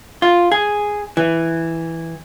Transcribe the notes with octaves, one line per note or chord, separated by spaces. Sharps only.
F4
G#4
E3